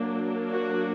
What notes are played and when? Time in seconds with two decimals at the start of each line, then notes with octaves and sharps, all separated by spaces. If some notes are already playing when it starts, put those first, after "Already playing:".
Already playing: F#3 A#3 D4
0.50 F#4